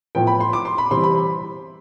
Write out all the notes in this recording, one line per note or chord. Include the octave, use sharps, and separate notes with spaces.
A2 F3 B3 G5
B5
C6
D6
C6
B5
C3 E3 G3 C4 C6
B5